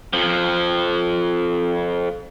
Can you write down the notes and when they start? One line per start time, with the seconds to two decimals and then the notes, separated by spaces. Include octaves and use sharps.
0.13 F2 F3